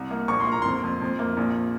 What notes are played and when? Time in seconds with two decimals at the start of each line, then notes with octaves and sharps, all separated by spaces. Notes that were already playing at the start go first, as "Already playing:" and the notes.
Already playing: C2
0.11 A#3
0.28 A#1 C#6
0.40 C6
0.47 A#3 A#5
0.62 F2 C6
0.83 F2
1.01 F2
1.19 A#3
1.37 A#1